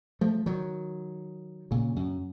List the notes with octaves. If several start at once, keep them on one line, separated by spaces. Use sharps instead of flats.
F3 A3
D#3 F#3
A#2 C#3
F#2